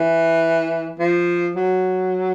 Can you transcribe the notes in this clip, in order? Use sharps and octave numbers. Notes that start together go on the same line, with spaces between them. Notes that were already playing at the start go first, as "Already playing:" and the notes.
Already playing: E3
F3
F#3